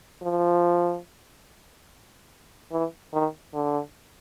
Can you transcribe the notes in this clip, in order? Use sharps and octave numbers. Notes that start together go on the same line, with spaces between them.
F3
E3
D#3
D3